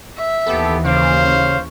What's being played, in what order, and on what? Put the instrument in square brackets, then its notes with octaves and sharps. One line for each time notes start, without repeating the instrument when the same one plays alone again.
[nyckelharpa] E5
[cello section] D#2 E3 [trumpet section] B3 G4 [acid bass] A4
[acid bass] C#3 [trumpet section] C5 F5 [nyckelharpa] D6
[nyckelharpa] C#4